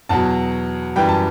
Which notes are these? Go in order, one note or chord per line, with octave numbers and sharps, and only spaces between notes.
E2 B2 F#3 A5
F#2 E3 G3 G5
A5